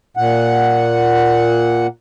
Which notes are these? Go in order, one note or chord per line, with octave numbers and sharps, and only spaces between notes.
A#2 F#5